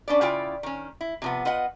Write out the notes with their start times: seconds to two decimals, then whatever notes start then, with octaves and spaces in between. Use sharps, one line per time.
0.08 C#4 D4 B4 D5
0.21 C#3 E4 F4 D5 G5
0.63 D#3 C#4
1.01 E4
1.22 C3 F3 B3
1.45 F4 B4 D#5 F#5